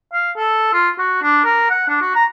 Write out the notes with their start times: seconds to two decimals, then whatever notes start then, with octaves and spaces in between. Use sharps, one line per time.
0.13 F5
0.37 A4
0.73 F4
0.99 F#4
1.22 D4
1.45 A#4
1.70 F#5
1.88 D4
2.01 F#4
2.15 A#5